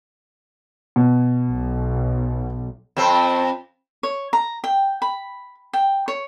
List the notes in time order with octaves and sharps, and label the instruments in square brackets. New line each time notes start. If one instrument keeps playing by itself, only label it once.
[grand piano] B2
[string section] B1
[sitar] F2 C4
[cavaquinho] C#5
A#5
G5
B5
G5
C#5